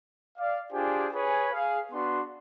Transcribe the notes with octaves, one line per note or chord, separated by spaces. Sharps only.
D5 F5
D4 F4 G4 G#4 C5 G#5
G#4 B4 C#5 G#5
G#4 F5
B3 D4 F#4 C6